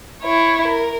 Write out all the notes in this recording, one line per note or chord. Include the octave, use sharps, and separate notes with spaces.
E4 C#5
A#4